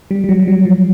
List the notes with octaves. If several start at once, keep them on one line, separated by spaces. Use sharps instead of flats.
G3
G3
F#3
G3
F#3
F3